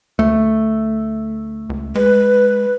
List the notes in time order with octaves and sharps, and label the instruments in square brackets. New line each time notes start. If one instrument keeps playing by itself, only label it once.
[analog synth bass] D2 [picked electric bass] A3
[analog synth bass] C#2
[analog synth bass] G#3 [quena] B4